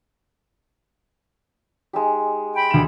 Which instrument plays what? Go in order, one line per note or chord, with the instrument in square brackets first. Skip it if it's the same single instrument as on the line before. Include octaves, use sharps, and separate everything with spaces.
[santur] G#3 D#4 G4
[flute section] G5 B5
[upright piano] D2 E7